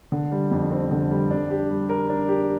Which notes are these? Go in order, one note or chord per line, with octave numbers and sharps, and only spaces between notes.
D3
G3
F2
C4
D3
G3
D4
G4
G3
A#4
D4
G4